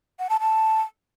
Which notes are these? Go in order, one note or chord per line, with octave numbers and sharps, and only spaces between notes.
F#5
A5
A5